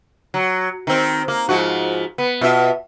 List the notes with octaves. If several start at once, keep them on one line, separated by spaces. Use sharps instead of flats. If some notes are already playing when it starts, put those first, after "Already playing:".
F#3
D#3 C4
A#3
G#2 F3 F#4
B3
B2 F4 E5